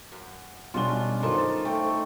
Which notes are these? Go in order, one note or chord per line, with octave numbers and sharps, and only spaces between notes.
F#2
B1 G3 C#4 D4 F4 F#4 G7
G2 D#3 F#3 D#4 F4 A4 A#4 C5
A6
A3 G5